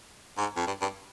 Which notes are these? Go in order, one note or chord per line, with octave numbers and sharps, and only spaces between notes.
G#2
F2
G2
G2